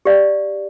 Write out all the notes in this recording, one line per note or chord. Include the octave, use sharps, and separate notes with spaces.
G4 D5 F5